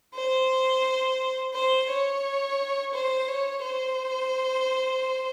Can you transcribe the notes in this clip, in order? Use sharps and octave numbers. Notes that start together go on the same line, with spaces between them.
C5
C5
C#5
C5
C#5
C5